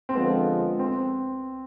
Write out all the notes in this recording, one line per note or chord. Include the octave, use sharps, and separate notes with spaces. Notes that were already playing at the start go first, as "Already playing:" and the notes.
C4
D3 F3 G#3 B3
C4